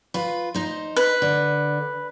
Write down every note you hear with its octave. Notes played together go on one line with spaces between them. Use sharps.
F4 B4
D#4 C5
B4
D3